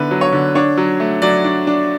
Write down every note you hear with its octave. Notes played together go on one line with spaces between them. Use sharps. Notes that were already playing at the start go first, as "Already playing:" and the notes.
Already playing: D3 B3 E4 B4
F#3
C#5
D3
D4 C#5
F#3
A3
F#3 D5
D4
D4